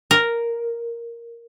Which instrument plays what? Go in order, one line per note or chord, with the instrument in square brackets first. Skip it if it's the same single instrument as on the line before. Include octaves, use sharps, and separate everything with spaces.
[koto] A#4